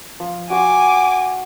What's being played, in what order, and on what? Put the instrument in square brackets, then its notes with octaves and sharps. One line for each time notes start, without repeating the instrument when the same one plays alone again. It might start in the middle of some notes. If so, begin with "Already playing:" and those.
[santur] F3
[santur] F#4 C6 [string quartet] G#5 D6